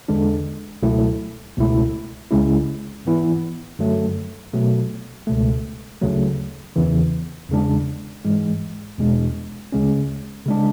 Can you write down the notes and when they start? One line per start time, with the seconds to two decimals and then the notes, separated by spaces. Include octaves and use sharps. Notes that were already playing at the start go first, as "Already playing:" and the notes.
0.08 E2 D3 G#3 D4
0.83 C#2 B2 F#3 A3 E4
1.57 C#2 B2 A3 E4
2.31 C#2 C#3 G#3 C#4 E4
3.05 G#2 E3 B3 E4
3.79 F#2 D3 F#3 A3
4.53 B2 F#3 A3
5.27 C#2 B2 A3
6.01 D2 C#3 F#3 A3
6.76 E2 C#3 E3
7.50 E2 C#3 G#3 D4
8.25 G#2 E3 G#3
8.98 E2 B2 G#3 D4
9.72 D2 C#3 G#3 C#4
10.46 C#3 G#3 D4